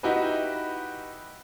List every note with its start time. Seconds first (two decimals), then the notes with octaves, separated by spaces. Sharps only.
0.03 D#4 E4 F#4 G4 B4